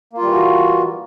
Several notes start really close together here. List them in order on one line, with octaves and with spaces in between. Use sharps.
A#3 F4 G3 E3 F#4